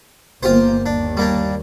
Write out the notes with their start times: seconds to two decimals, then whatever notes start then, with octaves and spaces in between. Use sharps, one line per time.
0.43 G1 A#3 F4 G4 C5
0.86 D#2 D4
1.17 G3 A#3 D4